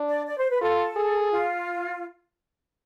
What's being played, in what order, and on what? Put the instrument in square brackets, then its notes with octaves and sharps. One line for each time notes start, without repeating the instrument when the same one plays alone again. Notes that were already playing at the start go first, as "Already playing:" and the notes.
Already playing: [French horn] D4
[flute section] D5
D5
C5
B4
[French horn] F4 [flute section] A4
[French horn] G#4
[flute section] F4